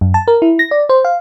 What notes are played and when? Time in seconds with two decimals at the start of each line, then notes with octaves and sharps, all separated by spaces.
0.01 F#2
0.14 A5
0.28 A#4
0.42 E4
0.59 A#6
0.71 D5
0.89 C5
1.05 F5